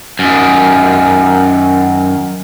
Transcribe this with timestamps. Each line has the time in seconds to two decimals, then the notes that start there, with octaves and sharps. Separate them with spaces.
0.19 F#2 D#3